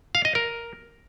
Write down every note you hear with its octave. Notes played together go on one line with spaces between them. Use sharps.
F5
D#5
A#4